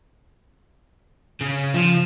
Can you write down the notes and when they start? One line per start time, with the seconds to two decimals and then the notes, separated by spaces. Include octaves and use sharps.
1.41 C#3
1.74 F3